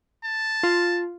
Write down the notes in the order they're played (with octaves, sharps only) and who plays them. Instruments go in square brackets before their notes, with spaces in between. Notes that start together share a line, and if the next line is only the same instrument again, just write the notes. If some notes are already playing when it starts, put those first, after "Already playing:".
[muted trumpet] A5
[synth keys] F4